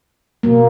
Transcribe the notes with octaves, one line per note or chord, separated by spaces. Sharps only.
B2 A#3